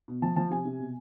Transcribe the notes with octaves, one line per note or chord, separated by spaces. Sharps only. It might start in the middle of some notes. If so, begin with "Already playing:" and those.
B2
F3 A5
F3 A5
C3 G#5
C3
B2